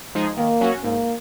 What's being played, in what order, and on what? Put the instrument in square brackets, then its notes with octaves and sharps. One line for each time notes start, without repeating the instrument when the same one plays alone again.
[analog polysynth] F3 G#3 D#4 G#4
[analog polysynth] D#3 [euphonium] A#3
[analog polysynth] F#3 C#4 F#4
[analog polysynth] G#2 [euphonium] A#3